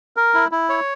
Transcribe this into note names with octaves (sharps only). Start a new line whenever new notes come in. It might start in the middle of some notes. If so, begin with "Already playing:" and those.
A#4
E4
E4
C#5